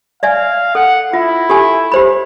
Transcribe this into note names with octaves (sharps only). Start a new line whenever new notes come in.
D5 E5 F5 G#5
A4 F#5
E4 F4
G4 A4 G#5
G4 C5 B5